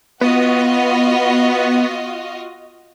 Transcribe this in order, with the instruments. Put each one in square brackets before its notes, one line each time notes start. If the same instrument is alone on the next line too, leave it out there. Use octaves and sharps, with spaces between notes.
[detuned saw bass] B3 [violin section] F4 F#4 D#5